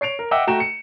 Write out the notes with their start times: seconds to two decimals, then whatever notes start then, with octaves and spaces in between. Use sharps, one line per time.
0.01 C#5 C7 D7 F7
0.19 A#4
0.31 D#5 E5 F#5 G5 D6 E6
0.47 A3 F#4 G5 A#5 E7
0.60 C#7